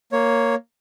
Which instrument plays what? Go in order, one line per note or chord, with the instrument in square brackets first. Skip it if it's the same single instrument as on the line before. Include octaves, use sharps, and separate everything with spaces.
[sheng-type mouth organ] A#3 C#5